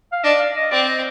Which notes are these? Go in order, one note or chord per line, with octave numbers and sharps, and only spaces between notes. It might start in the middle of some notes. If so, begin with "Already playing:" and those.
F5
D4 D#5
F5
D#5
C4 D5
D#5